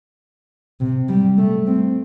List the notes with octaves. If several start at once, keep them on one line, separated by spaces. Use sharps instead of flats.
C3
G3
A3
C4